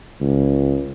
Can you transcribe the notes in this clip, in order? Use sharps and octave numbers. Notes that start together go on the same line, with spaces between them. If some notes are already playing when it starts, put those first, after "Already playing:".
C#2